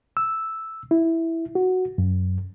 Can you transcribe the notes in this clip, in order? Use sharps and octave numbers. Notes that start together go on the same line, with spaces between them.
E6
E4
F#4
F#2